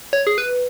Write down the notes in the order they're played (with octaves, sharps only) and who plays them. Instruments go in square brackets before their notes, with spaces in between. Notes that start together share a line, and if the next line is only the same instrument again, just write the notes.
[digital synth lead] C#5
G#4
B4